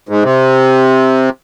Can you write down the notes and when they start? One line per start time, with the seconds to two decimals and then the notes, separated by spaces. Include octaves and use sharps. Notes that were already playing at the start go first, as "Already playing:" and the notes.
0.09 G#2
0.23 C3